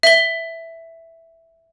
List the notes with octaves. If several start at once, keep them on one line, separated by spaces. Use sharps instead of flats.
E5 G7